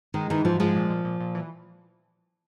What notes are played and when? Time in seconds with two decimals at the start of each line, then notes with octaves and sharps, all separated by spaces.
0.14 D#3 G#3
0.30 D#3 E3
0.45 G#2 F3
0.60 F3 G#3
0.75 A#2
0.90 A#2
1.05 A#2
1.20 A#2
1.35 E3